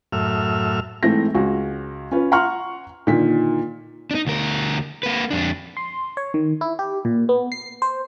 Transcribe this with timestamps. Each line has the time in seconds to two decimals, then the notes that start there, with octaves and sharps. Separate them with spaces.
0.12 F#2 A2 E5 F6
1.03 G#2 E3 A3 C4 A#6
1.35 C#2 C#4 F#4
2.11 C#4 F4 B4
2.32 F#5 A#5 C6 C#6 F6
3.07 A#2 D3 D#3 B6
4.11 D4 D#4
4.27 D2 A#4
5.03 A#3 B4
5.31 F2 D4
5.77 C6
6.17 C#5
6.34 D#3
6.61 E4
6.79 G4
7.05 A#2
7.29 B3
7.52 C7
7.82 C5